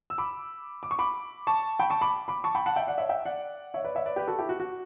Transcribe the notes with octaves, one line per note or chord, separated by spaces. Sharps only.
E6
B5 D6
D6
C#6
B5 D6
A5 C#6
G5 B5
A5 C#6
B5 D6
B5 D6
A5 C#6
G5 B5
F#5 A5
E5 G5
D5 F#5
C#5 E5
E5 G5
D5 F#5
C#5 E5
B4 D5
C#5 E5
B4 D5
G4 B4
F#4 A4
E4 G4
F#4
F#4